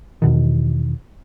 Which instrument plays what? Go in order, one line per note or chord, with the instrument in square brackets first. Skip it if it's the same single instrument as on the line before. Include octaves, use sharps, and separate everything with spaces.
[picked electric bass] E2 B2 D#3